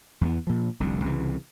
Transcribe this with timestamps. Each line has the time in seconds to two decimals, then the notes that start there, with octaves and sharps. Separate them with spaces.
0.21 E2 A3 B3
0.47 A#2 F3
0.80 F1 C2 D3
1.04 C2 C#3 E3